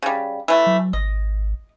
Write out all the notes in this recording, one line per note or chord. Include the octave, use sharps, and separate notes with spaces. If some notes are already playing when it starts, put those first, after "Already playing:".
C#3 G3
E3 A3
F#3
G#1 D#5